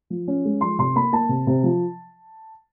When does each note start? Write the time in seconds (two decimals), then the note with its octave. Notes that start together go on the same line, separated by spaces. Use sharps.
0.10 F3
0.28 C#4
0.45 G#3
0.61 F3 C6
0.79 C3 C6
0.95 A#3 B5
1.12 A#3 A5
1.29 C3
1.47 C3
1.63 F3